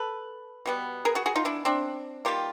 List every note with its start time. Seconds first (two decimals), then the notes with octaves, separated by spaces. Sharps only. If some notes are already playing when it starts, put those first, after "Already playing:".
Already playing: A4 B4
0.66 B2 G3 B3
1.05 G#4 A#4
1.15 F#4 G#4
1.26 F#4 G#4
1.35 D#4 F4
1.45 D4 E4
1.65 C4 D4
2.25 D#3 G3 A#3 F4 G4